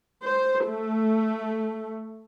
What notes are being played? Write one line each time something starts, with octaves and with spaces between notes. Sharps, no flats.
C5
A3